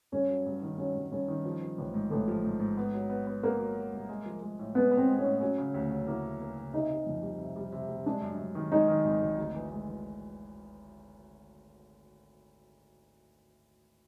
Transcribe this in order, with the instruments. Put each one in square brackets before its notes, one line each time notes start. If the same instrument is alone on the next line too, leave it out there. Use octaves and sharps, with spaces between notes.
[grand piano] G2 [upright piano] C#4
[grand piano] F#3
G2
D#3
[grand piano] F#3 [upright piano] C#4
[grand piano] G2
[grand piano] G2 [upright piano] C#4
[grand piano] D#3
F3
F3
A1
G#2
[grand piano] A1 [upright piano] A3
[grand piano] F3
G#2
G#2
B3
F#3
B3
B3
[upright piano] A#3 [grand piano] B3
[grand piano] F#3
F#3
C2
G#3
F3
G#3
A2
[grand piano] G#3 [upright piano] B3
[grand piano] B3
[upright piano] C4
[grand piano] G#3
[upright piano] C#4
[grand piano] A2
[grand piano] F#3 [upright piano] C#4
[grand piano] C#3
D2
F#3
[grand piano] A#3 [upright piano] E4
[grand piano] F#3
A#3
C#3
[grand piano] C3 [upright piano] D#4
[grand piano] C3
F2
G3
C3
G3
C3
G3
[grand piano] G#3 [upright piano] D4
[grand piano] F#2
F#2
D#3
[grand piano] G#3 [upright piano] D#4
[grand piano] D#3
G#1
G#1
D2
E3
G#3
E3